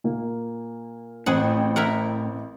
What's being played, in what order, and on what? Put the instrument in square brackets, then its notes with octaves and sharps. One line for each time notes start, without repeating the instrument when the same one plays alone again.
[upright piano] A#2 A#3
[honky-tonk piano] A1 C4 G5 [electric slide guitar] A2 [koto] G#4 F#5
[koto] E4 A#4 F#5